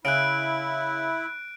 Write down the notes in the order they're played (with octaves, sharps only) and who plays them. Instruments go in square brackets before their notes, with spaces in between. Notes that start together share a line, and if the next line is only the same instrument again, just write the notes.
[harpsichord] C#3 [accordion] E4 [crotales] F#6 D7